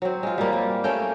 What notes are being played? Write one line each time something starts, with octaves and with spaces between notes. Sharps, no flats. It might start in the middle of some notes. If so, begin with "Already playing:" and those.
F#3 C4
G#3 F4
G3 A#3
G3
A3 A#3 C#4 G5